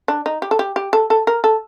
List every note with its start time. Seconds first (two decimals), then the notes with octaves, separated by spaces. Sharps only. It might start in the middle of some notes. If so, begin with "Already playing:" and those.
0.08 D4
0.26 D#4
0.42 G4
0.51 A4
0.59 G4
0.76 G4
0.93 A4
1.10 A4
1.27 A#4
1.44 A4